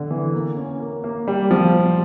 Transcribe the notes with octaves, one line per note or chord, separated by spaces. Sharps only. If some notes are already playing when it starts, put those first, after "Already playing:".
Already playing: D3
E3
A#3
C#4
A#3
A#3
G3
F3